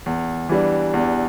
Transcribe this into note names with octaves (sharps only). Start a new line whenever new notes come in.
E2
E3 G3 D4
E2